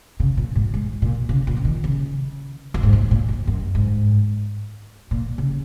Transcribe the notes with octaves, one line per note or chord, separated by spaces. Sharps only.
C#3
A#2
G#2
G#2
A#2
C#3
A#2
C#3
D#3
C#3
F#2
G#2
A#2
A#2
F#2
F#2
G#2
A#2
C#3